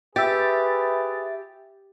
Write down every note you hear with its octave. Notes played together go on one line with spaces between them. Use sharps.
G4 G#4 B4 E5 A6